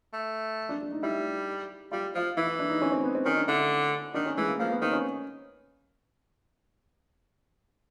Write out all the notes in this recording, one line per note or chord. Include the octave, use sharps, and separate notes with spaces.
A3
D4
D4
D#4
G3 E4
G3 F4
F3 F4
E3 E4
E4
D4
D#4
C#4
C4
B3
C4
D#3 C#4
D4
D3 E4
D#3 D4
C#4
E3 G#3
A#3
F3 A#3
B3
D#3 C4
C#4